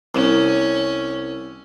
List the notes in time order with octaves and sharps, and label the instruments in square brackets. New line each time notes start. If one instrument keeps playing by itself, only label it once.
[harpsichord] C2 [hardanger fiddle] C#4